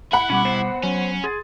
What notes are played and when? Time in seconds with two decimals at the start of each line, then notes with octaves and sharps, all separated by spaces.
0.13 E4 F#5 B5
0.30 B2 G3 C#4 D6
0.45 B3 C5
0.83 F#3 C#4
1.24 G#4 C6 A6